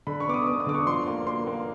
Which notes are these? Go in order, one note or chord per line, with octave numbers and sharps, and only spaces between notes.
D3 B5
C#6
B3 D6
D#6
B3 D6
D#6
D3 D6
C#6
F3 C6
A#3
A#3 C6
A#3